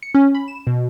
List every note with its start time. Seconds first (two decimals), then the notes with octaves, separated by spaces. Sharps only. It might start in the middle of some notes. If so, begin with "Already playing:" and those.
0.03 C#7
0.14 C#4
0.35 B5
0.48 E7
0.67 B2